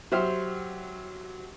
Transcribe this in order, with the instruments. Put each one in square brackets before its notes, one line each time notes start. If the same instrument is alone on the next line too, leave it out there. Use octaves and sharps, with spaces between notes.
[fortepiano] F#3 G4 C5 E5 F6